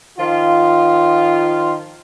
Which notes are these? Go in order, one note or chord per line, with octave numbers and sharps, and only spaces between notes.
D#3 F3 F4